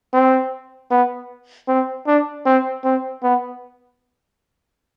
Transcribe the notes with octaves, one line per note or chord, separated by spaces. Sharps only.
C4
B3
C4
D4
C4
C4
B3